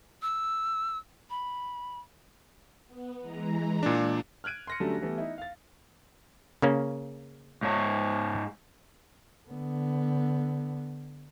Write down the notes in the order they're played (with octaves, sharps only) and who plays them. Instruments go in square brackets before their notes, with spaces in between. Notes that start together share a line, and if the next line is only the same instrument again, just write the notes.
[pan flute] E6
B5
[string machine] B3
E3 G#3 A#5
[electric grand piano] A#2 D4
[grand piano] F6 F#6 G#6 D7 D#7
C6 A#6 C#7
D3 F#3 G3 A3 C#4 D4
E3 G3 A3 B3
D#4 E4
F5 A6
[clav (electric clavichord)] C#3 A#3 C#4
[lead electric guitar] G#2 C#5
[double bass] D3 B3